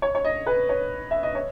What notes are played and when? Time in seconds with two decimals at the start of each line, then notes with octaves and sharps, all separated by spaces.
0.02 C#5
0.15 C#5
0.25 D#5
0.46 B4
0.69 C#5
1.11 E5
1.23 D#5
1.35 C#5